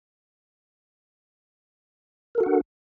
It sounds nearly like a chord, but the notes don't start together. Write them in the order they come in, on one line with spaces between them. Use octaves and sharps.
A#4 A4 F#4 F#5 D4